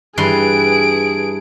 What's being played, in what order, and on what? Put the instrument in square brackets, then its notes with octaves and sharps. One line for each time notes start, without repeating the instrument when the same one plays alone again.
[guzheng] G2 E3 C6 [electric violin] G#4 D7